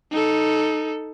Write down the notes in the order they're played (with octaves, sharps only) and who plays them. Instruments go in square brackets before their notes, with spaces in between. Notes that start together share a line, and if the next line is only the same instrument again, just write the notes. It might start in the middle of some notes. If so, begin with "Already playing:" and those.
[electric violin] D#4 A4